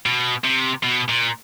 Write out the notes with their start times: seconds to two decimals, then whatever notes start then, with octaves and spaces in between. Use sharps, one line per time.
0.06 B2
0.44 C3
0.83 B2
1.08 A#2